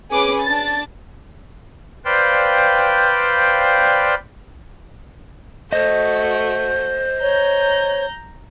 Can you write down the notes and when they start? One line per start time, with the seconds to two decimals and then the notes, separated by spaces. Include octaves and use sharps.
0.12 C#4 G#4 B4 D6
0.42 D4 A5 A6
2.05 B4 C5 D5 F5 G5
5.73 A3 F#4 C5 D#5
7.22 C#5 A#5 G6